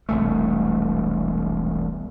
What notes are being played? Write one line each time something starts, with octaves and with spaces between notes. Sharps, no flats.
E1 C2 A3